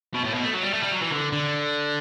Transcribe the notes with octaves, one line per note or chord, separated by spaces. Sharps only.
B2
A2
B2
A3
F#3
G3
A3
G3
F#3
E3
D3
D3